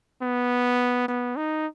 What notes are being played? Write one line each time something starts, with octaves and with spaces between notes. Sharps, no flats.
B3
B3
D#4